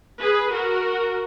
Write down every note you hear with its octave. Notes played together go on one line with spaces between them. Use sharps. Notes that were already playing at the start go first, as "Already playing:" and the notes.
G#4 B4
F#4 A#4